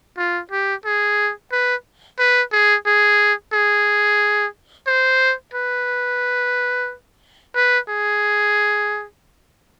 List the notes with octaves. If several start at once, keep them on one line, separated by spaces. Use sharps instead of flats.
F4
G4
G#4
B4
B4
G#4
G#4
G#4
C5
B4
B4
G#4